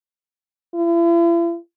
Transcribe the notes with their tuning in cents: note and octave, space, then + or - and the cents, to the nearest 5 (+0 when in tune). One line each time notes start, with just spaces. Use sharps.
E4 +45